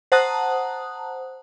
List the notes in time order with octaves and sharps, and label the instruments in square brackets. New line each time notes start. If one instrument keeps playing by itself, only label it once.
[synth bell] C5 F#5 A5 A#5 D#6 F#6